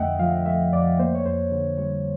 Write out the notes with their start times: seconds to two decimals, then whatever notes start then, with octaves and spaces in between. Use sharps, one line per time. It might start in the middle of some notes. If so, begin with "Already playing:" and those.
Already playing: F2 D3 A3 D#5 E5 F#5 G5
0.19 F3 F5
0.46 A3 E5
0.73 F2 D5
0.99 A#3 C5
1.14 C#5
1.25 F2 C5
1.52 D3
1.78 G3 C#5